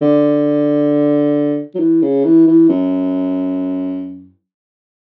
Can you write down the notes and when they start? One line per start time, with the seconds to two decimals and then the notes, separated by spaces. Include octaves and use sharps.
0.02 D3
1.75 F#3
1.80 E3
2.02 C#3
2.25 E3
2.47 E3
2.69 F#2